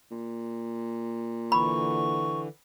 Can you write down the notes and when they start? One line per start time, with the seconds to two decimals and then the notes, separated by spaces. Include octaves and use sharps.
0.11 A#2
1.52 D3 E3 B5 C#6